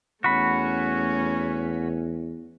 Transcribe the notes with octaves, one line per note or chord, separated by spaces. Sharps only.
E2 A3 C#4 F#4 B5